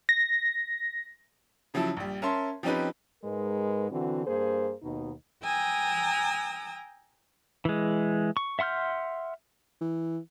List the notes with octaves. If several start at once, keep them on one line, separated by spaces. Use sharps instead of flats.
A#6
C#3 F3 F#3 E4 A5
A#1 G3
C#4 A#4 C#5 E5 A5 C6
F3 C4 C#4 D#4 G4 B4
G#2 G#3 A#4 B4
D3 E3 C4 F#4
G2 A#3 G#4 C5
D#2 B2 D#4
G5 G#5 A#5 D#6 E6
E3 G#3
C#6
E5 F#5 C6 F6 G6
E3